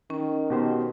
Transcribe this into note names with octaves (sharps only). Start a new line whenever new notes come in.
D#3 C#4
B2 F#4 G4 C5